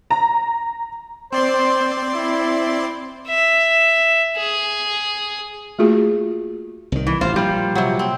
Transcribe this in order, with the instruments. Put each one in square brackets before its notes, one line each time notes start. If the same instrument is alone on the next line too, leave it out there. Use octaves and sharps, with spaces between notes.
[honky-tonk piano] A#5
[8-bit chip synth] C4 D5 C6 [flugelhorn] C5
[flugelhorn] E4
[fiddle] E5
G#4
[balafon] A3 A#3 F4 F#4 G#4
[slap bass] C2 D#3
[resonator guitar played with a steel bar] E3
[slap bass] A1 [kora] F4 [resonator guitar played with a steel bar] C5
[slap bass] A#2 F3 [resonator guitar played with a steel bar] G3
[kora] C3 F#3
C4